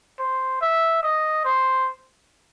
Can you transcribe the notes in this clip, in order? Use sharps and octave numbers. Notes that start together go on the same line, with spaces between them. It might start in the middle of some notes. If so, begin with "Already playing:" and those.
C5
E5
D#5
C5